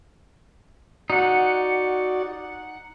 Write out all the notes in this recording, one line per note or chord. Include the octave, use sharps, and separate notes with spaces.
D#4 F#4 D5 F#5